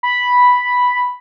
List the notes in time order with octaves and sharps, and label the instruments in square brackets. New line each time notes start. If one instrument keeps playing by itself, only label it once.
[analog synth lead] B5